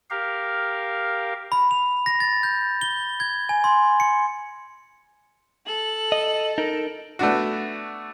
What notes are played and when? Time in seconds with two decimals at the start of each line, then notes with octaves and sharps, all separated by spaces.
0.10 G4 A#4 F5
1.52 B5
1.71 F7
2.06 A#6
2.20 A6
2.43 G6
2.81 G7
3.20 G#6
3.49 G#5
3.64 C6
4.00 C#7
5.66 A4 F#7
6.12 D#5
6.58 D#4 A#4 D7
7.19 A3 B3 D4 F#4